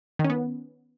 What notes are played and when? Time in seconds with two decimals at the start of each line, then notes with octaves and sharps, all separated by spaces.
0.19 D#3
0.25 C#4
0.30 B3